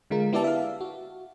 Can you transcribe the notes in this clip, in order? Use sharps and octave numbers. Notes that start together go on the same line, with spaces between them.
D3 G#3 F4 A#4
B3 E4 G4 D5 E5 A5
E5 F5
F#4